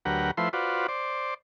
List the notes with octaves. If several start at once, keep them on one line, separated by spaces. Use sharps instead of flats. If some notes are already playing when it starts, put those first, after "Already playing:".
D2 F#3 G4 A#4 B4 F#5
F3 A3 E4 B4 C5 C6
F4 F#4 B4 C5 D5
C5 D5